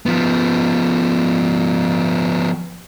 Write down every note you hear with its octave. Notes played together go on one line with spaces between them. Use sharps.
F3 B3